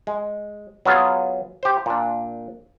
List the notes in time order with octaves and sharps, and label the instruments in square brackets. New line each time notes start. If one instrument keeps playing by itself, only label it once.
[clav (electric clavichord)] G#3
F#3 B3 F4 G#4
G4 C5
A#2 D4